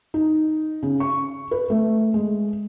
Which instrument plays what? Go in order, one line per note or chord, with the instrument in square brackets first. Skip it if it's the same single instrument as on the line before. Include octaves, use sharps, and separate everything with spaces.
[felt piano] D#4
C#3
C#6
B4
A3
G#3